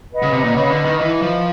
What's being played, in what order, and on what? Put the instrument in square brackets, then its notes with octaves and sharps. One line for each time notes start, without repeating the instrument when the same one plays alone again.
[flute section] B4 D#5 F#5
[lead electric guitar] C#3
C3
A#2
[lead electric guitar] C#3 [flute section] B4 D#5 F#5
[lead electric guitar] D3
D#3
[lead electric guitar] E3 [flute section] B4 D#5 F#5
[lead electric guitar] F3